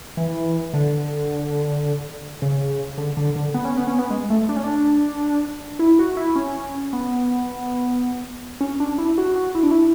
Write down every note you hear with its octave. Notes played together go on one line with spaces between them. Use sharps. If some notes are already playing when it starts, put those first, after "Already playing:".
E3
D3
C#3
D3
D3
D3
B3
C#4
B3
C#4
B3
G#3
A3
D4
C#4
D4
E4
F#4
E4
C#4
B3
C#4
D4
E4
F#4
F#4
E4
D4
E4